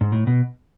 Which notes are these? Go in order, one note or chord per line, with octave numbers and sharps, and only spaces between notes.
G#2
A2
B2